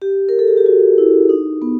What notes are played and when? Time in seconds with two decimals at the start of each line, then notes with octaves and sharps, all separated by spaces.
0.02 G4
0.29 A#4
0.39 A4
0.48 G#4
0.57 G4
0.66 F#4
0.98 E4
1.29 D#4
1.62 B3